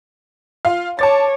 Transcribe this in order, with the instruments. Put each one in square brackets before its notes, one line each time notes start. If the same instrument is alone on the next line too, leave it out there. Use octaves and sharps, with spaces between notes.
[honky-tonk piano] F4 F5
[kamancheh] C#5 [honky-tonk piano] A5 D6 A6